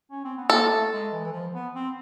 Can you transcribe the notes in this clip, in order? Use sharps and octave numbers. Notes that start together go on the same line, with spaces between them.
C#4
C4
B3
A#3 A4
A3
G#3
E3
E3
F3
B3
C4